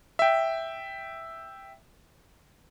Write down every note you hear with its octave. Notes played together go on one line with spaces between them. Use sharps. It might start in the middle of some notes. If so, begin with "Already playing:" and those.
E5 G5